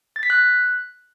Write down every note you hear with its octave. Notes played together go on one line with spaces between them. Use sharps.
A6
B6
F#6